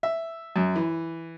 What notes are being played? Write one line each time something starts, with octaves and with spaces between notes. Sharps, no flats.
E5
F#2
E3